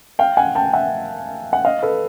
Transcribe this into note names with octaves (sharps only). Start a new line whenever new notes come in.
F5 G5
F#5 G#5
G5 A5
E5 F#5
F#5
D#5 F5
A4 B4